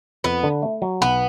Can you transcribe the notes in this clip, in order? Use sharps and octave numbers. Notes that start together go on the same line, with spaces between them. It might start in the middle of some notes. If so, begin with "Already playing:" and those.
F2 B3
D3
A3
F#3
B1 B3